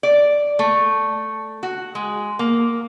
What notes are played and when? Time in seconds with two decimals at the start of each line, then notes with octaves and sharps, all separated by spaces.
0.03 D5
0.59 A3
1.63 F#4
1.95 G#3
2.39 A#3